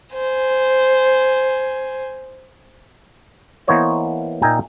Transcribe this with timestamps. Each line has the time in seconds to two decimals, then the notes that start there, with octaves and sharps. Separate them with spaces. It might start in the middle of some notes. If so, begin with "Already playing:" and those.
0.14 C5 G#5
3.67 E3 A#3 B3 C5 C#5 D#5
4.42 A#2 D#4 E5 G5 G#5 A#5